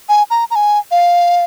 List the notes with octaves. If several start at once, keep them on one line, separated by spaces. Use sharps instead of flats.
G#5
A#5
A#5
G#5
F5